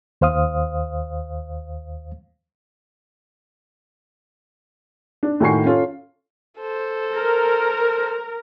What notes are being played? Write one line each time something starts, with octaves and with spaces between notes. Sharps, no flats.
D#2 C5 F5 D#6
D4
A2 D#3 F#4 G#5 C#6 C7
C#4 F4 A4
A4 C5
A#4